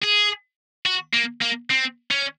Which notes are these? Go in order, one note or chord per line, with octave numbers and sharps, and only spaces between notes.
G#4
F#4
A#3
A#3
C4
C#4